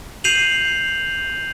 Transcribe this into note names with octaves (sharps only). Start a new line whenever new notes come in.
G6 C7 D#7 F7 F#7